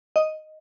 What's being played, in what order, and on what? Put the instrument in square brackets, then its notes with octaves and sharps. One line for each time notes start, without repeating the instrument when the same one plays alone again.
[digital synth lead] D#5